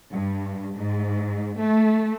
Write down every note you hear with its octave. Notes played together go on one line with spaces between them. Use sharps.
G2
G#2
A3